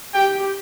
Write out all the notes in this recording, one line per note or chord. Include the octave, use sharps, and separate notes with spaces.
G4 G5